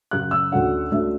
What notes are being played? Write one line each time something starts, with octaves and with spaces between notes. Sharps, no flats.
F#2 C#3 F#3 F#6
E6
D2 D3 A3 C#4 F#5
D2 D3 A3 C#4 E5